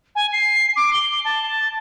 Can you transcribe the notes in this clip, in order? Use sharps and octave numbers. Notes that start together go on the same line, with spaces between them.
G#5
C7
D6
G7
A5